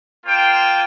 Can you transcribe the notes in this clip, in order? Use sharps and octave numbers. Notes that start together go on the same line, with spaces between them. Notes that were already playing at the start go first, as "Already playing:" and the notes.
A#3 F4 C5 G5